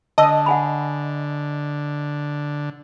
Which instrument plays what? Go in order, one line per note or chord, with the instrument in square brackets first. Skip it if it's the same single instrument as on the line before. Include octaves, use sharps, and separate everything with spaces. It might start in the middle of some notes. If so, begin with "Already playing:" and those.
[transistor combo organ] D3 [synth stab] D#5 [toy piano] A5 E6
[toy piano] F#5 G#5 B5